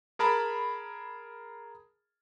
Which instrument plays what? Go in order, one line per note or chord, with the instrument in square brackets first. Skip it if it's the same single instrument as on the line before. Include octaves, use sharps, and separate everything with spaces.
[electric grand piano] G#4 A#4 A5 B5